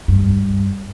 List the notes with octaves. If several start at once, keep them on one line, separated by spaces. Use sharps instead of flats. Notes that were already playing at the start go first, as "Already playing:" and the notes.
G2